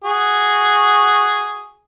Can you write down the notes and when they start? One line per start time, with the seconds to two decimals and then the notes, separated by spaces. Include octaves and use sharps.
0.04 F#4 G#4